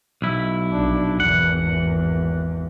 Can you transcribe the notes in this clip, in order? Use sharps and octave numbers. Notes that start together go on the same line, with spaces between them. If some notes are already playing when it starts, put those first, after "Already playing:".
B1 E4
A#1 D4
G#1 E2 F#5